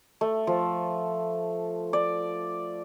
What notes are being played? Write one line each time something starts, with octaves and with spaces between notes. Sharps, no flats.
A3
F3
D5